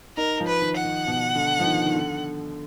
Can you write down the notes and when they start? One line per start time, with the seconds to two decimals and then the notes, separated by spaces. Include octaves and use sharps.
0.17 D#4 A#4
0.40 F3
0.47 B4
0.61 D#3
0.76 F#5
0.84 D#3
1.07 B2
1.35 D3
1.60 F3
1.66 D#3
1.86 D#3
1.96 D3